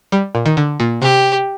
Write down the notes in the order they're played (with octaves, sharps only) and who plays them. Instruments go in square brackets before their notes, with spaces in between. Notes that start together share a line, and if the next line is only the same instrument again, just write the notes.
[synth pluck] G3
A#2
D#3
D3
A#2
[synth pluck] C3 [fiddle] G4